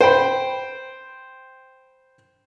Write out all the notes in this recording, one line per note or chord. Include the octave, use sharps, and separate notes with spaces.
C5 G5 B5